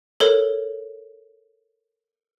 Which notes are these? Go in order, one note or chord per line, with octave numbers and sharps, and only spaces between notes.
A4 A#4 C#5